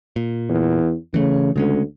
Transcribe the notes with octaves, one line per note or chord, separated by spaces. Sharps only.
A#2
E2
C#3 E3 A3
D2 C#3 G#3 C#4